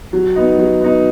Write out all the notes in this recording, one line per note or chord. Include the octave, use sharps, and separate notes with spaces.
F#3
B3 D#4
F#3
B3 D#4